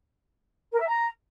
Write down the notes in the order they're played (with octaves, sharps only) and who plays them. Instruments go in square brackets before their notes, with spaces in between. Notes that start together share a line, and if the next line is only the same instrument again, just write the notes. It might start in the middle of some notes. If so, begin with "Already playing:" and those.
[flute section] A#4
E5
A#5